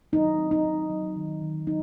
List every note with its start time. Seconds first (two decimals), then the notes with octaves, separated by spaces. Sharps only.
0.13 F#3 D#4
0.38 C4
0.51 D#4
0.64 F#3
0.90 F#3
1.16 D#3
1.42 D#3
1.67 F#3 D#4